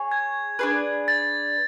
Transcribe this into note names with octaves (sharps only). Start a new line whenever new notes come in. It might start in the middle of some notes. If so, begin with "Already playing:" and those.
Already playing: G#4 C#5
G#6
D4 G#4 B4
A6